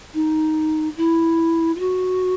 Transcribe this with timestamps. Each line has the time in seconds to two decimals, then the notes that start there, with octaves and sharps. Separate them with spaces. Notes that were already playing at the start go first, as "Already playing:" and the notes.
0.14 D#4
0.97 E4
1.75 F4
1.79 F#4